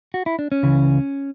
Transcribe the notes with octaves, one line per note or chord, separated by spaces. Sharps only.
F#4
E4
D4
C#4
C#2 C#3 E3